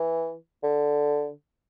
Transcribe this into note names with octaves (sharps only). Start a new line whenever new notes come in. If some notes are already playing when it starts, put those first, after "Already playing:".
Already playing: E3
D3